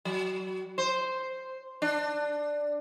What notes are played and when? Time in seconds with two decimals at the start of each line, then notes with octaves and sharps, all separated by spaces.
0.05 F#3
0.78 C5
1.82 D4